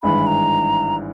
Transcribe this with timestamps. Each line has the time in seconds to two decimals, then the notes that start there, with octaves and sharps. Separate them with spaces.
0.03 G#1 G2 E3 G#3 B5
0.27 A#5